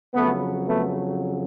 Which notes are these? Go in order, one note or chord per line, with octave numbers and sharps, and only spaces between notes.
F2 C#3 F#3 A3 B3
A3 B3